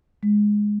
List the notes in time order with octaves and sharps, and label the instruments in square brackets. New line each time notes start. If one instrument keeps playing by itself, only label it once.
[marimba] G#3